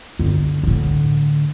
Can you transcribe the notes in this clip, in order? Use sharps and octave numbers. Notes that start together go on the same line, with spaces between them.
G1 D3
A2 D3